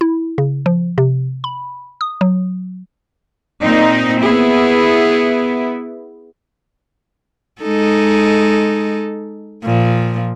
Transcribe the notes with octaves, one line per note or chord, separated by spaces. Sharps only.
E4
C#3
F3
C3
B5
D#6
F#3
A#2 C4 D#4
B3 E4 G#4
G#3 D#4 A4
A#2 F3